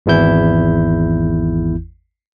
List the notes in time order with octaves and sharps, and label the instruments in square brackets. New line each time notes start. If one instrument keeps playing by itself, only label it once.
[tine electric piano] G#1 E2 E3 E4 G6